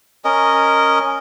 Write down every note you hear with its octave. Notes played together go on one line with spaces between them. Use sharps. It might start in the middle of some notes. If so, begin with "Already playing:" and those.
C#4 A#4 D#5